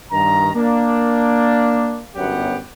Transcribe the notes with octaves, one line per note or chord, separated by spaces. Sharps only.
G2 D#3 A#5
A#3 D4
G1 F#2 F#3 B3 G4 F#5